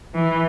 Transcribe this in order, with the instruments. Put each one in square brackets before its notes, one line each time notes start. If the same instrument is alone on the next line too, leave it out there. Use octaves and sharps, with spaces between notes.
[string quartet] E3